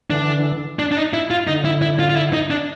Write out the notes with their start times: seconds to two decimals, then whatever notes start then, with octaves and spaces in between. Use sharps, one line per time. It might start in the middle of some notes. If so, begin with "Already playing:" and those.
0.10 D3 E3 D4
0.79 D4
0.92 D4
0.97 D#4
1.13 E4
1.31 F4
1.47 D3 D#4
1.65 E4
1.82 E4
1.99 F4
2.10 F4
2.16 E4
2.33 D#4
2.51 D4